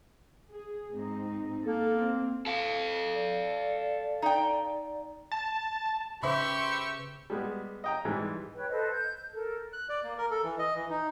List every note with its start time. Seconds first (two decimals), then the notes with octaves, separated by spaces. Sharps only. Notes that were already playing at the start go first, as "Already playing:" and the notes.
0.51 G#4
0.91 G#2 C4 D#4
1.64 A#3 A4
1.98 C4
2.47 A4 F5
3.14 D5
4.22 D#4 G5
5.31 A5
6.23 C#3 G4 B4 C5 E5 B5 C#6 E6
7.30 G3 G#3 B3
7.84 D#5 G5 A#5
8.05 G#2 E3 G3 G#3
8.55 B4 C#5 G5
8.70 A4 B4 C5 D#5
8.91 G6
9.17 G6
9.33 A4 A#4
9.73 F#6
9.89 D5
10.03 A#3
10.18 A#4
10.31 A4
10.43 E3
10.59 D#5
10.75 E3
10.89 D#4